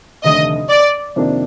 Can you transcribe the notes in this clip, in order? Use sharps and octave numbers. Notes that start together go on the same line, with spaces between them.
F1 D#2 D3 A3 D#5
D5
F2 C3 D#3 A#3 D4